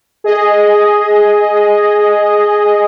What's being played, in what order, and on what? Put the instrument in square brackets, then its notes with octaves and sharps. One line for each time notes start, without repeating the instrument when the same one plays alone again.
[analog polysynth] G#4 D#5